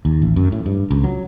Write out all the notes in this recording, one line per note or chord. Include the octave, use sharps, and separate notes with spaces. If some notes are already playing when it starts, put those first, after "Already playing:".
D#2
A1
F#2
A2
G2
C#2
F#3